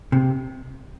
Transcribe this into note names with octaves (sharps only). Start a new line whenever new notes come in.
C3